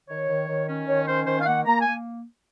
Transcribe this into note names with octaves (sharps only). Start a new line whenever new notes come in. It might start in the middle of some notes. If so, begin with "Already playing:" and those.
D#3 C#5
D#3
D#3
C#4
D#3 C#5
C#4 C5
D#3 C5
F5
A#3 F#5
A#3 A#5
G#5
A#3